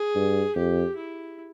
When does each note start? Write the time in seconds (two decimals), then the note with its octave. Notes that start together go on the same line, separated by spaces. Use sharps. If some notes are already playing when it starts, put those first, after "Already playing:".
Already playing: G#4
0.15 G2
0.55 F2 G4
0.96 E4